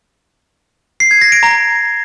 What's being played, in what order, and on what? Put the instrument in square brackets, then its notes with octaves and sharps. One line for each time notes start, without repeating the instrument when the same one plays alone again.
[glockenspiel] C7
G#6
A#6
D7
A#5